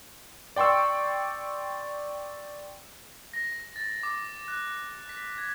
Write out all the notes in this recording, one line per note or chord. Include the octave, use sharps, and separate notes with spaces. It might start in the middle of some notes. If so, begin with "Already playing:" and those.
D5 G5 C6 C#6 E6
A#6
A6
D6
F#6
B6
G#6